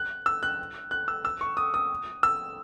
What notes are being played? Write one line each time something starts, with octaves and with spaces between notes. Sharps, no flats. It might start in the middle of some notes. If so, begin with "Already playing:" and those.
Already playing: F#6
E6
F#6
F#6
E6
E6
C#6
D#6
D#6
E6